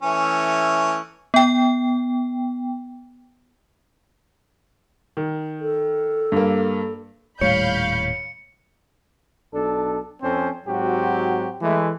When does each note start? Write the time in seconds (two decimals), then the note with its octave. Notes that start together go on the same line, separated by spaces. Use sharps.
0.03 E3 A3 C#4
1.34 B3 G5
5.17 D#3
5.60 A4
6.32 G2 A#3
7.41 D#1 A2 G3 C#5 F5 B5 G6 C#7
9.54 B1 D4 A4
10.22 F2 C4 C#4 A4 C5
10.66 G#2 F#3 C4 F#4 G4
11.62 E3 G#3 A3